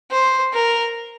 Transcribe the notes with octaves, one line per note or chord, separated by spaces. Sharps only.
C5
A#4